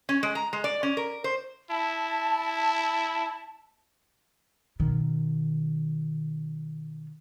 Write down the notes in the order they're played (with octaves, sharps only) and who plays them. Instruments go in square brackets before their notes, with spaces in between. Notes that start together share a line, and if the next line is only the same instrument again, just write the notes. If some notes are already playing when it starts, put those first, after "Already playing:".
[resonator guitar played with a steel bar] C#4
G#3
A#5
G#3
D5
C#4
A#4
C5
[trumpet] E4 [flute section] A5
[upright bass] B2 D#3